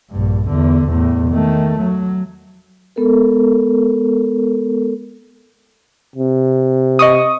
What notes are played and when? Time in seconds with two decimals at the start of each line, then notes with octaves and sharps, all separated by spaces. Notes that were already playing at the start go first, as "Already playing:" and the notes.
0.11 A#1 G2
0.49 E2 D3
0.89 E2 A2
1.29 D#3 A3
1.79 F#3
2.96 G#3 B3 A4 A#4
6.16 C3
6.99 D#5 C#6 D#6